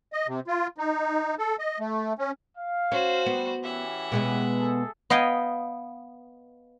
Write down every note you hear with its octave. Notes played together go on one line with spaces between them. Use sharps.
D#5
C3
F4
D#4
A4
D#5
A3
C#4
F5
C#4 F#4 C5
G3 B3
E3 C#4 G4 E5 F#5
B2 G#3 B3
G#4 A4
B3 D#5 F5 G5 G#5